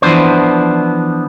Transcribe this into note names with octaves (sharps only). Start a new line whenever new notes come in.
E3 F3 B3 D4 C5